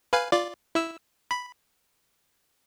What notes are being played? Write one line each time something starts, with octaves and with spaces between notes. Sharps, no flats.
B4 F5 G#5
F4 D5
E4 E6
B5